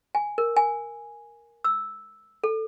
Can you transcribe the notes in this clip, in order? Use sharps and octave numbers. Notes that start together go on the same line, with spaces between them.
G#5
A#4
G#5
E6
A4